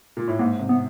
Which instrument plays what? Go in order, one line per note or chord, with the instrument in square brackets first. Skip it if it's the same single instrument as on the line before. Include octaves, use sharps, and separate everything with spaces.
[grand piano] A#2
A2
[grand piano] G#2 [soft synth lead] A#3
[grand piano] C3
[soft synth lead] B3